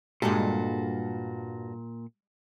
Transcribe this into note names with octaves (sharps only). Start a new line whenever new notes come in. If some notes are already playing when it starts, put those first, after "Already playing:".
G2 A#2 G3 G#3 F#4 A4